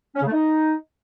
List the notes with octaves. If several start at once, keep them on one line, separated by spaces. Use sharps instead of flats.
C#4
C#3
A3
D#4